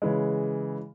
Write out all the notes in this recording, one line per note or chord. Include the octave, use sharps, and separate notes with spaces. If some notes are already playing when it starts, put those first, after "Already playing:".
C#3 E3 G#3